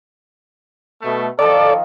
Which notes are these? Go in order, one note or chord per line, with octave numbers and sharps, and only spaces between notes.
B2 A3
D#3 F3 A4 D5